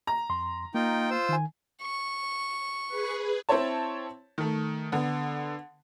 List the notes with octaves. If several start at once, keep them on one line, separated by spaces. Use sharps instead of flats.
A#5
F2 C6
A#3 D#4 F4 G5
F4 C5 E6
D#3 G#5
C#6
G#4 B4
C4 E4 C5 C#5 A5
D#3 A3
D3 B3